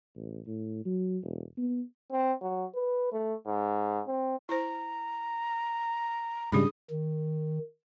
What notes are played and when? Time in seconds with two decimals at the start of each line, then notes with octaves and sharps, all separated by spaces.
0.15 A1
0.47 A2
0.85 F#3
1.23 E1
1.58 B3
2.11 C4
2.42 F#3
2.75 B4
3.12 A3
3.47 G#2
4.07 C4
4.49 E4 C5 A#5
6.52 G#2 C#3 G3 D4 G#4 B5 D#6
6.91 D#3